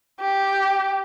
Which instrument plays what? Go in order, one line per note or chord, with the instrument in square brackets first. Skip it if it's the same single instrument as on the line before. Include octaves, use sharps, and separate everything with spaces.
[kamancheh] G4